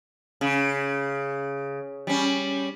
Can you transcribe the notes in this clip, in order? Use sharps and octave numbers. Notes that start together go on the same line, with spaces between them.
C#3
G3 C#4